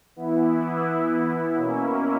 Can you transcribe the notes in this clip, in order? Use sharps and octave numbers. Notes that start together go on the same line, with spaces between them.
E3 B3 E4
B2 A#3 C#4 E4